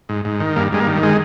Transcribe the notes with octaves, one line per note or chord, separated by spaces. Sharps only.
G#2
G#2
D#3
G2 A#3
G2 G#3
A#3
D#3
G#3